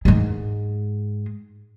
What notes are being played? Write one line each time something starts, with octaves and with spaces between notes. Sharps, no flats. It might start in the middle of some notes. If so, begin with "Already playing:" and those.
G#2 G#3